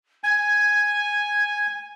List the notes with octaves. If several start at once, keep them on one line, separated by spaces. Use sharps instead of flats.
G#5 G#6